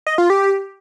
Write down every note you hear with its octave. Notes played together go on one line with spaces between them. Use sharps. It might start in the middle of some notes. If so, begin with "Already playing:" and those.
D#5
F4
G4